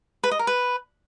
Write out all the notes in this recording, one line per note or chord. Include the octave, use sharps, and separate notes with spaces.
B4
D#5
A#4
B4